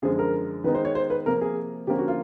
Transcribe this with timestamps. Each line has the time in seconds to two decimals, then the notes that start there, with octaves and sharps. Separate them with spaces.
0.02 F#2 D3 F3 G#3 G#4
0.19 A#4
0.64 D#3 G#3 B3 D#4 B4
0.75 C5
0.85 C#5
0.95 C5
1.10 B4
1.26 C3 F3 A#3 A#4
1.41 G#4
1.87 D3 F3 A#3 C#4 G4
1.99 F#4
2.08 F4